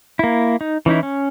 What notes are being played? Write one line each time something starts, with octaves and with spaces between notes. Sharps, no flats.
A#3 E4
D#4
E3 C#4 D#4 E4
C#4